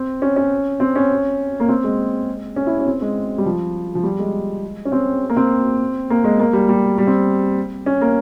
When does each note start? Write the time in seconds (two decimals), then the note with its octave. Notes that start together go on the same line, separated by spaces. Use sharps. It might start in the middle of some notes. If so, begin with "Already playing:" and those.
Already playing: C4
0.22 C#4
0.36 C#4
0.80 C4
0.96 C#4
1.60 A#3
1.69 C4
1.84 G#3
2.56 C#4
2.67 E4
2.80 C#4
2.87 C4
3.02 G#3
3.38 G3
3.46 F3
3.95 F3
4.03 G3
4.19 G#3
4.85 C#4
4.92 C4
5.30 A#3
5.37 C4
6.10 A#3
6.24 G#3
6.40 A#3
6.53 G3
6.69 G3
6.98 G3
7.07 C4
7.86 C#4
8.01 A#3